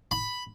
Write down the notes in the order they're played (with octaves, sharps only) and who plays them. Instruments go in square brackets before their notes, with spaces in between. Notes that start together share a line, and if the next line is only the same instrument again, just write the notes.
[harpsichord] B5